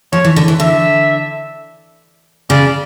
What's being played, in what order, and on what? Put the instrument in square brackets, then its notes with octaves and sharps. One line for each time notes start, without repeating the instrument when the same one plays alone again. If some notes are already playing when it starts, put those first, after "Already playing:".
[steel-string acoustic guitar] F3 [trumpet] C#5
[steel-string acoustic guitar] E3
D3
E3
[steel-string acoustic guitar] D3 [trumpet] E5
[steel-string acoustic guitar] C#3 [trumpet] D5